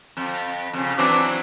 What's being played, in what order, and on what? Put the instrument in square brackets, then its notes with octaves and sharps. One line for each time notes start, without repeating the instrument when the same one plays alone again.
[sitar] F2
F2 C#3
[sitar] E3 F#3 C4 [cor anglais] D4